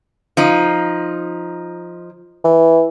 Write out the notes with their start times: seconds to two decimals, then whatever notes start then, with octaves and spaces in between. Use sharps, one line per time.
0.37 F3 D#4
2.44 E3